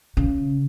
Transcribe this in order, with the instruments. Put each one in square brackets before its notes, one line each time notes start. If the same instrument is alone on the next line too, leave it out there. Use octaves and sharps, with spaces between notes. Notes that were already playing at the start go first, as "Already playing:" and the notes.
[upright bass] C#3